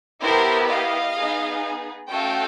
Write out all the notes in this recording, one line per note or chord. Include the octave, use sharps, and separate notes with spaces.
B3 E4 G4 A#4 C5
D#5 F5
B3 D#4 G#4
A3 C#4 F#4 A4 F5 G5